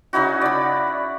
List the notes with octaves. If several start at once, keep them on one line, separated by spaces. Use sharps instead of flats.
C#3 D#4 E4 F#4
D5 B5